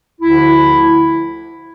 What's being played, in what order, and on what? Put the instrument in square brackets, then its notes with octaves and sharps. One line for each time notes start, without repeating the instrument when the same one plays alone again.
[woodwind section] D2 D3 F3 E4